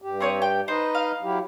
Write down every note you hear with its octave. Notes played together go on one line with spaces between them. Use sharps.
G2 G4
C4 C#5 D#6
G5
D#4 B4 C5 D#5
F5
F#3 E4 G4